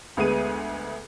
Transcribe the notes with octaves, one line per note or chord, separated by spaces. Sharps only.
D2 G#3 B3 G#4 D#7